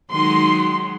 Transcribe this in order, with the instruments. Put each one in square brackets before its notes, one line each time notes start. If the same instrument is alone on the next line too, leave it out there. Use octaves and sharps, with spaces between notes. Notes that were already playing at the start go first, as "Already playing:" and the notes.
[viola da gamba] D#3 F#3 G#3 [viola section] C6